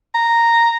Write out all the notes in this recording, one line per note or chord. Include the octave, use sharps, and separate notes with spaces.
A#5